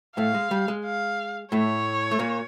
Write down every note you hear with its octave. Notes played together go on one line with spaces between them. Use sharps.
A2 A3 F5
G#3
G3
G#3
F5
A2 A3 C#5
A3
A#2 A#3